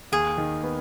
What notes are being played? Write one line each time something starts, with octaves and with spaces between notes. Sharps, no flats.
D#2 G#4
D#3
B3